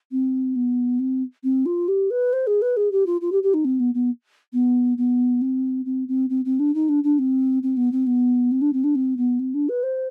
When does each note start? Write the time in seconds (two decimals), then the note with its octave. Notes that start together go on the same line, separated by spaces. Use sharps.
0.11 C4
0.55 B3
0.99 C4
1.43 C4
1.65 F4
1.88 G4
2.10 B4
2.33 C5
2.47 G#4
2.61 B4
2.76 G#4
2.91 G4
3.06 F4
3.21 F4
3.32 G4
3.43 G4
3.54 D#4
3.64 C4
3.79 B3
3.94 B3
4.53 B3
4.97 B3
5.41 C4
5.85 C4
6.08 C4
6.29 C4
6.45 C4
6.59 D4
6.74 D#4
6.88 D4
7.03 D4
7.18 C4
7.63 C4
7.77 B3
7.92 C4
8.06 B3
8.51 C4
8.61 D4
8.73 C4
8.84 D4
8.95 C4
9.17 B3
9.39 C4
9.54 D4
9.69 B4
9.83 C5